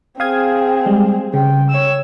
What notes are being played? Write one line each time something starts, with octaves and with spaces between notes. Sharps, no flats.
C4 G#4 F5 D#6 G#6
G3 G#3
C#3 G5
C#5 E6